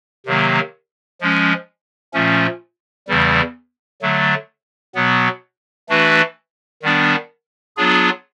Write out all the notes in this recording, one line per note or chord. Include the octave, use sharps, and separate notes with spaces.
C3 D#3 F#3 A#3
F3 G#3 C#4
A#2 F3 A3 C#4
E2 C#3 E3 G3
D3 F#3 A3
B2 F#3 B3
E3 A3 D4 F#4 B4
D#3 G3 B3 D4
F#3 B3 D4 F4 G#4